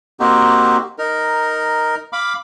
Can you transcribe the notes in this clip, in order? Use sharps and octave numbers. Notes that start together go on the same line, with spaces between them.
A#3 C4 D#4 F#4 G4
D#4 A#4
F5 B5 D6